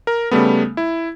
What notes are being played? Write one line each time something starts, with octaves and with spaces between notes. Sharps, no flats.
A#4
C#3 G3 A3 B3
E4